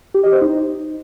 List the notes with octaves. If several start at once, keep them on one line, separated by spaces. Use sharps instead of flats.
G4
D#5
C5
D#4